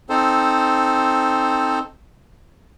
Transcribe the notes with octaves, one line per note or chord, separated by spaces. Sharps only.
C4 D#4 A4 C5